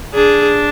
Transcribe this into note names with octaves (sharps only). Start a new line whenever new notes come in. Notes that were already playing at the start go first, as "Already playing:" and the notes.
D4 G#4